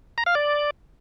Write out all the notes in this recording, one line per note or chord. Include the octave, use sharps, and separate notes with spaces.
A#5
F5
D5